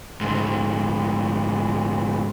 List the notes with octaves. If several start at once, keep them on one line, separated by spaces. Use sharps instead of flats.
D2 G#2